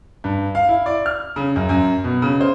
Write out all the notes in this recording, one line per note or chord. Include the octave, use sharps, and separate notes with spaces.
G2
F5
E4
D5
F6
C#3
F#2
F#2
B2
C#3
C5